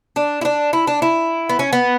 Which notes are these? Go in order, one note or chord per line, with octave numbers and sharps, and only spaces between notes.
D4
E4
D4
E4
D4
E4
B3
C#4
B3